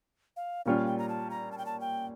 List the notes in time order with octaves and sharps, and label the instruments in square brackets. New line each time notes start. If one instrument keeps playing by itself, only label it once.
[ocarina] F5
[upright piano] A#2 G3 C#4 F4 [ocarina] F5
[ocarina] G5
A#5
A5
A#5
A5
G5
A5
G5